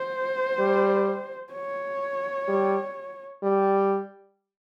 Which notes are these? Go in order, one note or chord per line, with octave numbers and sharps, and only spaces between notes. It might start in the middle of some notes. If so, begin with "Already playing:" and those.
Already playing: C5
G3
C#5
G3
G3